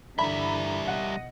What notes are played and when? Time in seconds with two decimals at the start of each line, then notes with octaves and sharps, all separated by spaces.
0.19 G2 D3 E3 G3 E5 A#5 B5
0.87 B2 D#5 F#5